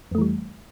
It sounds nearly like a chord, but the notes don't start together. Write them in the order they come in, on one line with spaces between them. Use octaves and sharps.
F2 A3 E3 G3